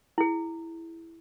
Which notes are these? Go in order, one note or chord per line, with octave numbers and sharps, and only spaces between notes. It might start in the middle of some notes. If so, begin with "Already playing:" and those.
E4 G#4